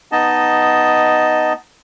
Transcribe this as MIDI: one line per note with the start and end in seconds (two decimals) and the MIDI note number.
0.12 1.53 59
0.12 1.53 63
0.12 1.53 75
0.12 1.53 81